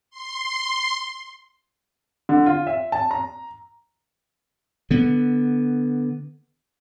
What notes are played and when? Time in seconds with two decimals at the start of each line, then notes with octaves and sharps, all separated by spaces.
0.10 C6
2.29 D3
2.46 F4
2.67 E5
2.92 A5
3.11 A#5
4.91 D3 B3